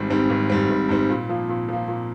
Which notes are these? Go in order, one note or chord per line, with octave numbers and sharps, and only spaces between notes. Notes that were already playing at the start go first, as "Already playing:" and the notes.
Already playing: G#1 G#2 G3 C4
G#2 G3 C4
G#1
G#2 G3 C4
G#1
G#2 G3 C4
A#2
F3 A#3
A#2
F3 A#3
A#2